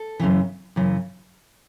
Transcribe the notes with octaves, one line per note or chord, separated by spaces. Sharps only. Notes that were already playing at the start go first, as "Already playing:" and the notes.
Already playing: A4
F#2 C#3 E3
F#2 C#3 E3